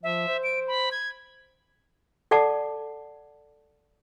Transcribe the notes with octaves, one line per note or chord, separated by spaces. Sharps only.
F3 E5
C5
D7
B5
G#6
A4 D5 F#5 A5 D6